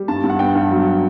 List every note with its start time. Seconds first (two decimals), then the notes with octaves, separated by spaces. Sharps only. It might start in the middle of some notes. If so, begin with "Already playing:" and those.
Already playing: G3
0.08 G2 A5
0.23 G2
0.30 F#5
0.39 B3 G5
0.55 G2
0.71 F#3